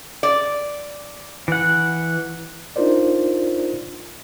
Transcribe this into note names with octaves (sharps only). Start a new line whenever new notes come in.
D5
E3 F#5
D4 D#4 F4 A#4 C5 D5